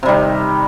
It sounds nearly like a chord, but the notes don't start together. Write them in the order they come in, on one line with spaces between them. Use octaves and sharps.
C3 G3 D#3